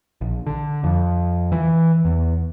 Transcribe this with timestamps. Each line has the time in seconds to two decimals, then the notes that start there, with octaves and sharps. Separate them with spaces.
0.21 A#1
0.47 D3
0.84 F2
1.52 E3
2.05 E2